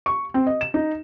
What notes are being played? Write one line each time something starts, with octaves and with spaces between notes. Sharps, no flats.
C#6
C4
D#5
E7
D#4